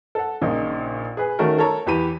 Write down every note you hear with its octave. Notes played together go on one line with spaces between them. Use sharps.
A4 F#5
A#1 A#2 C#3 D#4
G#4 B4
D#3 A3 C#4 F#4 A#4
A4 A#4 C#5 A#5
E2 E3 G4 B5 D#7